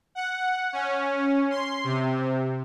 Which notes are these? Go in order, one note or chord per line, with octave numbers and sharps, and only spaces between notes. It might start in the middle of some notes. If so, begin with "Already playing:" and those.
F#5
C#4
C6
C3